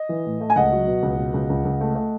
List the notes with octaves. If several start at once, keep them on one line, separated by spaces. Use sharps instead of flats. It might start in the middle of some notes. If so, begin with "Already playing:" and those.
Already playing: D#5
E3
A2
A3
G#5
C#2 D#5 F#5
F#3
B2
C#2
B2
C#2
C#2
C#2
A3
A3